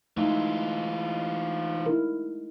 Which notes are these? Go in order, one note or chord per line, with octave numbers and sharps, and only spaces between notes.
E3 G#3 A3 D#4 F4 E5
E4 A#4